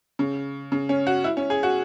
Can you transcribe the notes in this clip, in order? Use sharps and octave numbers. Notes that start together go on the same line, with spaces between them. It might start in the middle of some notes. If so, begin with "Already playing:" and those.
C#3
C#3
C#4
F#4
E4
C#4
G#4
F#4